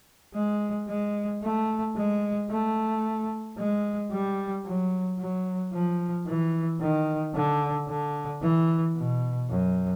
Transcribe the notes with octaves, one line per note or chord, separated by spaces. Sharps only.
G#3
G#3
A3
G#3
A3
G#3
G3
F#3
F#3
F3
E3
D#3
D3
D3
E3
B2
F#2